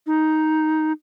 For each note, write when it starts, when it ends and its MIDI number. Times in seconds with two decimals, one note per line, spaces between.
0.07 0.92 63